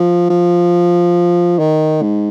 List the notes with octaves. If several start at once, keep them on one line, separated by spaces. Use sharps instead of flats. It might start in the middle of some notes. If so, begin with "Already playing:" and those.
Already playing: F3
F3
D#3
G#2